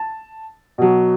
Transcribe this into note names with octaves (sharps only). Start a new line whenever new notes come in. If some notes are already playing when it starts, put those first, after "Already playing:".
Already playing: A5
B2 F#3